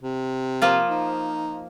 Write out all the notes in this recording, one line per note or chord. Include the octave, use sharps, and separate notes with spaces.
C3
F3 A#3 F4
D#4